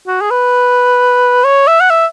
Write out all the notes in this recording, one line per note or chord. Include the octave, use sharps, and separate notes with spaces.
F#4
G#4
B4
C#5
E5
F#5
E5